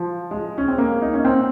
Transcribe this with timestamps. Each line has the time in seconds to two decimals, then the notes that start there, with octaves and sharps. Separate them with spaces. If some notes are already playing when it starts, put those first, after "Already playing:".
Already playing: F3
0.31 G#3
0.58 C#4
0.68 C4
0.78 A#3
1.02 D#4
1.13 C#4
1.25 C4